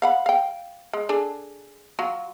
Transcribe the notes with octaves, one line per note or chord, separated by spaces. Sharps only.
F5 F#5 B5
F5 G5
G#3
D4 G#4 A4
F#3 F4